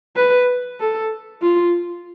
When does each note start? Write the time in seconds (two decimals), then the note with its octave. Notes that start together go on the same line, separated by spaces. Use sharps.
0.16 B4
0.80 A4
1.42 F4